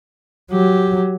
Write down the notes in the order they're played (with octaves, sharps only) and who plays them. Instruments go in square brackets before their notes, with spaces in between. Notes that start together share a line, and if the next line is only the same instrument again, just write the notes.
[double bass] F#3 [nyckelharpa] G4